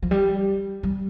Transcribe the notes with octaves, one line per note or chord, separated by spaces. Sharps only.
F3
G3
G3